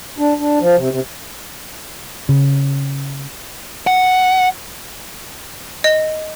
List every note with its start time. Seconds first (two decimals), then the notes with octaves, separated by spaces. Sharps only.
0.18 D4
0.39 D4
0.60 F3
0.77 C3
0.91 C3
2.29 C#3
3.87 F#5
5.84 D#5